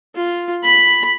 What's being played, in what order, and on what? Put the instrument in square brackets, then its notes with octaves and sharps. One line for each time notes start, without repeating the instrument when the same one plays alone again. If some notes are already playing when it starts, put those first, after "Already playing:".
[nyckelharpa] F4
B5